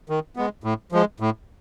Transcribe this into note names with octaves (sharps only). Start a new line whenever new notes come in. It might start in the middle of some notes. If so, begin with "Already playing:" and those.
D#3
G#3 B3
A2
F3 G#3
A2